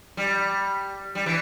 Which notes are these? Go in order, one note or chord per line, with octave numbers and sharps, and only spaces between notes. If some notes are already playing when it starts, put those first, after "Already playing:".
G3
G3
E3